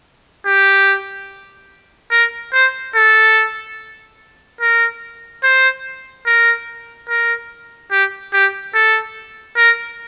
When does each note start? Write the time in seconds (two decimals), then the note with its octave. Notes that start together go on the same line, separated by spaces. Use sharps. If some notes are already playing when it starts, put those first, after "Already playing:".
0.46 G4
2.12 A#4
2.53 C5
2.95 A4
4.61 A#4
5.43 C5
6.26 A#4
7.09 A#4
7.91 G4
8.33 G4
8.74 A4
9.57 A#4